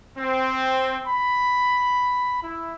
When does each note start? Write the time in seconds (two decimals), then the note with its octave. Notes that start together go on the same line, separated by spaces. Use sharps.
0.17 C4
1.06 B5
2.42 E4